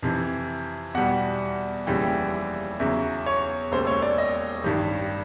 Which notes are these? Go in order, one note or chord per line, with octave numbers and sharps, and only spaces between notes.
F2 C3 E3
E2 B2 G3 F#5
F1 D#2 C#3 E3 G3 G5
E2 C#3 F#3 E5
C#5
E1 D#2 C#3 C5
C#5
D5
D#5
A1 G2 D#3 G3